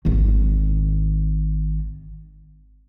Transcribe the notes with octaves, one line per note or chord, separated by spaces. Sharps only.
G#1 D#3